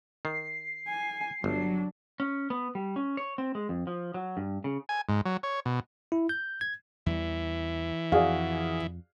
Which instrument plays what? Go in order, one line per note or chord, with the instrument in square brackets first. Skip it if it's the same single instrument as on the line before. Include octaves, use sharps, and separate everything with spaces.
[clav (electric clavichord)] D#3 [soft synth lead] C7
[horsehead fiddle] G#5
[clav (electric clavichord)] G1 [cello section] F#3 [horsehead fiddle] D4
[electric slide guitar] C#4
B3
G3
C#4
C#5
C4
G#3
F2
F3
F#3
G2
C#3
[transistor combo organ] G#5
G#2
F#3
C#5
B2
[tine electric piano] E4
G6
G#6
[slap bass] E2 G3 [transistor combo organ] E3
[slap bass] F2 [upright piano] F#4 G#4 D5 [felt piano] F5